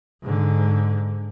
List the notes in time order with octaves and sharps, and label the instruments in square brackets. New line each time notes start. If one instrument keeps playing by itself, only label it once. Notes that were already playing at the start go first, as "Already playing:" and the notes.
[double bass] G#2 D3